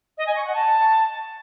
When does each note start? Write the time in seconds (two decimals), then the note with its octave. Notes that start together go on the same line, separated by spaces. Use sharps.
0.18 D#5
0.27 G#5
0.36 C#6
0.45 F#5
0.54 A5